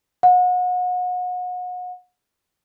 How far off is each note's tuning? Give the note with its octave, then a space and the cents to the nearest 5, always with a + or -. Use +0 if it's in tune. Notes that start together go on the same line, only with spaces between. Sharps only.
F#5 -35